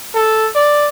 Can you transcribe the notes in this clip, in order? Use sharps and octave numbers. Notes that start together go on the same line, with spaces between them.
A4
D5